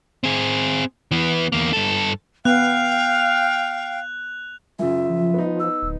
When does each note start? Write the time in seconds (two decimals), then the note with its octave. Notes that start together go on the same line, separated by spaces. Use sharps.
0.24 C4 G#4
1.11 E3 B3
1.52 E2 A#3
1.73 G2 A4
2.45 B3 F5 G5 F#6 F7
4.79 F#2 C#3 F4 E5
5.09 F3
5.34 B3 D#4
5.60 E6
5.83 D1